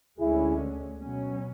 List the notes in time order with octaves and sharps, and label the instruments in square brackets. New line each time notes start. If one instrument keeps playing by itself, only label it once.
[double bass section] D2 D3 G#3 C#4 [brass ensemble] E4 G#4
[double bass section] B2 F#3 C#4